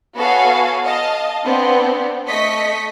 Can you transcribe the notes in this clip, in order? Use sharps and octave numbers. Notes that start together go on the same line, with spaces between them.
B3 F#4 A4 C#5 F5 G#5
D#5 F5 A5
B3 C4 D4
A3 D#5 C#6 B6